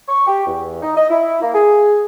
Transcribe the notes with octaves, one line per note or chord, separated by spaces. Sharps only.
C#6
G4
E2
D#4
D#5
E4
A#3
G#4